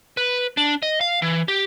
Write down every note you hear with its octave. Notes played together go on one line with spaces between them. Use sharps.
B4
D4
D#5
F5
E3
G4